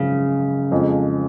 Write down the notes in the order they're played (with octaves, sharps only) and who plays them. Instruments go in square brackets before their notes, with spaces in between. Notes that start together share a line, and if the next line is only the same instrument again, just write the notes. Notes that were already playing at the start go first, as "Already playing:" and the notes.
Already playing: [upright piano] G#1 F#2 F3 G#3 [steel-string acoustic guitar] C#3
[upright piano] F2 F3 G#3